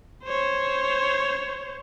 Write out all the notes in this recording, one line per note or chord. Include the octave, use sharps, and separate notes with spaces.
C5 C#5